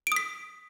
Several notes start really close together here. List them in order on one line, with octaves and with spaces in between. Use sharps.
D7 D#6 B6